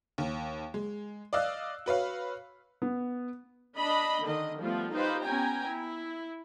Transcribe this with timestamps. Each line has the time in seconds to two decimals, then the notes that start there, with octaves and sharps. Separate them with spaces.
0.18 D#2
0.74 G#3
1.33 D5 D#5 F5 E6 F#6
1.86 F#4 B4 C#5 F5
2.82 B3
3.77 D4 D#5 B5
4.24 D3 D#3 D#5
4.60 F3 G3 A3 B3 F4
4.93 D#4 F4 G4 B4 C5 F5
5.25 B3 C#4 G5 G#5 A#5
5.68 E4